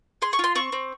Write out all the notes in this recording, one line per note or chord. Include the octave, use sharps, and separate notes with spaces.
G#4 C6
C#6
F4 C6
C4 C#6
C4